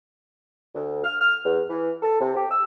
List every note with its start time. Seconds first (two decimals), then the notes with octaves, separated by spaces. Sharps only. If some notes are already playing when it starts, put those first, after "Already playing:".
0.75 D2
1.04 F6
1.21 F6
1.44 E2
1.70 E3
2.02 A4
2.20 C3
2.36 G4
2.51 E6